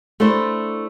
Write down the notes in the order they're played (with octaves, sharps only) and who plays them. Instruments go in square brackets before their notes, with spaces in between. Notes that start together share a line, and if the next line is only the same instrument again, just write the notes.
[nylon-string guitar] A3 D4 E4 C5